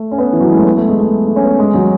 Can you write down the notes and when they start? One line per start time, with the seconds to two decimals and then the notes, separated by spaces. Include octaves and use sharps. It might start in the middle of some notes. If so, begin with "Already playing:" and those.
Already playing: A3
0.11 C#4
0.18 B3
0.33 E3
0.40 F#3
0.49 G#3
0.57 A3
0.65 B3
0.77 A3
0.88 G#3
1.00 A3
1.27 A3
1.36 C#4
1.43 B3
1.59 G#3
1.74 F#3